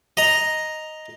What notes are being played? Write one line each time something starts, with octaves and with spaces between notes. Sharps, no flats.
D#5 A#5